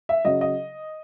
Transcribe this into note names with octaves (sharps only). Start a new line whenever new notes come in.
E5
C#3 F#3 D#5
D#5